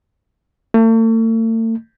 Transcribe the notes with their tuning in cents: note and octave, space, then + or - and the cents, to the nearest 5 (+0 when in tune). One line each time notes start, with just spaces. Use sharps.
A3 +40